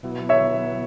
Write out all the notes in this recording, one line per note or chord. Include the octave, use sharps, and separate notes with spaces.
B2 F#3 B3 E4
C#5 E5